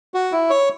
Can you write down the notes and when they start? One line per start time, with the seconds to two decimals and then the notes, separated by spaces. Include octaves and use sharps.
0.14 F#4
0.32 E4
0.50 C#5